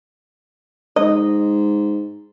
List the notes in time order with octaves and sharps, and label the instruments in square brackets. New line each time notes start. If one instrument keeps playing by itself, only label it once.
[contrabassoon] G#2 [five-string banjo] D#5